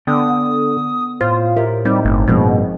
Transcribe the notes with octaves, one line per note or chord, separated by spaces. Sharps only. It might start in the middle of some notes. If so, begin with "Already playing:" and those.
D3 B3 D5 G5 D#6
A2 F4 C5
G4 A#4 E5
G3 C4 D#4
G1 A3
G2 B2 F3 G#3 A#3 C4 C#4